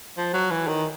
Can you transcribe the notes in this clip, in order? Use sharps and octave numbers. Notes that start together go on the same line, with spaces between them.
F3
F#3
E3
D#3